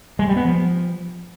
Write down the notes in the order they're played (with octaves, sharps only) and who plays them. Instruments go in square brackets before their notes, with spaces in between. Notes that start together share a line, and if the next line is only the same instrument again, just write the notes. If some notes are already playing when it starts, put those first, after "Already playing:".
[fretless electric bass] G#3
G3
B3
F3